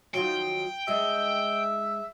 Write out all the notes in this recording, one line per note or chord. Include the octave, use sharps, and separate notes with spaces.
D#3 F3 F#3 G5
G#3 D4 E5